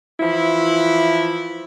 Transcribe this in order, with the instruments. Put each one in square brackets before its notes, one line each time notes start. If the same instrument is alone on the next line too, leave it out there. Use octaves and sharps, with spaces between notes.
[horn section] E3 F3 E4